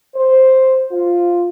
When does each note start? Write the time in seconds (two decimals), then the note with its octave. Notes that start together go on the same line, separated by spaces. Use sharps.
0.15 C5
0.91 F4